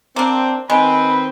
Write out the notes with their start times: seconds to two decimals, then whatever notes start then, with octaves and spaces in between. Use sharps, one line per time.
0.16 A#3 C4 D4
0.70 D#3 G#3 C4 B4